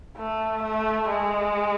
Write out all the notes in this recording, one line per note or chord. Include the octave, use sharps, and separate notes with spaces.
A3
A3
G#3